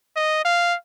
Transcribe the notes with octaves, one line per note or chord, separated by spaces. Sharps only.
D#5
F5